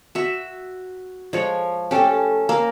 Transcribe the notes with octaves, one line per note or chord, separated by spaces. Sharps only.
F#4 E5
F3 G#3 C#5
A3 C#4 G4 A4
A#3